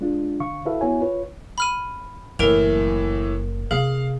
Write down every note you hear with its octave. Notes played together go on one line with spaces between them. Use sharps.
G#3 D4 F4
D3 F5 C#6
E4 F#4 A4 B4 E5 F5
B3 E4 F#4 C#5 G#5
F4 B4 C#5
B5 F6 D#7
F#1 A2 E3 A#4 D7 F7
C3 G#4 F5